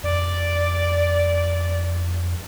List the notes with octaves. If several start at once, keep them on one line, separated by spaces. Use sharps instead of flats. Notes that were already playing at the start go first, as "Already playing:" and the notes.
F2 D5